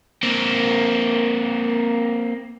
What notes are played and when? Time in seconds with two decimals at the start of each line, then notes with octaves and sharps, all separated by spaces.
0.23 A#3 C4